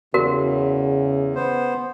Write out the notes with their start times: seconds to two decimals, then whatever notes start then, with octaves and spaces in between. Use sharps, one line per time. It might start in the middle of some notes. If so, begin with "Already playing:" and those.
0.14 E2 C#3 F#4 A#4
1.35 B3 C5